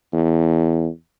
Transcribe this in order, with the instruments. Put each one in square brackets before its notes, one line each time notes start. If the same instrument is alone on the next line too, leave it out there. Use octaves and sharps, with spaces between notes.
[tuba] E2